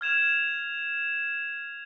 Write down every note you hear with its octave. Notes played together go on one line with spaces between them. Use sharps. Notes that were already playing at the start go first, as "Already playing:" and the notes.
F6 G#6 E7 F7